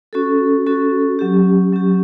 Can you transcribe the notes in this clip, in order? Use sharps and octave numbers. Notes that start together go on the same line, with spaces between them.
C#4 F#4 A4
C#4 F#4 A4
F#3 C#4 G4
F#3 C#4 G4